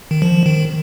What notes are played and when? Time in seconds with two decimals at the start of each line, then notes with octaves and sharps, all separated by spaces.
0.11 D#3
0.22 F3
0.46 D#3